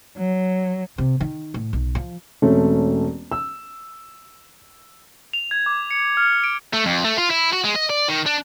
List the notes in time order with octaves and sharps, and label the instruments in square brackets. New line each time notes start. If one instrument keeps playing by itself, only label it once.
[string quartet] F#3
[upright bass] C3
D#3
A2
B1
F3
[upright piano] E1 A3 C4 C#4
E6
[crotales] F7
G#6
D6
C#7
F6
D7
[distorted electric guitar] A3
F2
A3
F4
E4
F#4
G#3
D#5
D5
D#3
D4